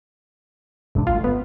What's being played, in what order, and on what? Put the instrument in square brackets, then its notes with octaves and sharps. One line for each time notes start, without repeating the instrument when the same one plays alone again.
[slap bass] E1 D4 [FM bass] G#2
[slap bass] G1 A3 [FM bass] F4
[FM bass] B3